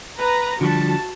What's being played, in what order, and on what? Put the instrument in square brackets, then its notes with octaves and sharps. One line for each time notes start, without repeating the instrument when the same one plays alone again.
[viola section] B4 A#5
[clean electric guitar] D3 F3 G3 [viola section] F#4 A5